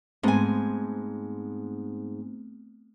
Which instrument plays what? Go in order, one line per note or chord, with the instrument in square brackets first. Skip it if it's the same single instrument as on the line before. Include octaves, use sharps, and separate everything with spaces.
[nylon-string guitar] G#2 G#5 [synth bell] A3 B3 C4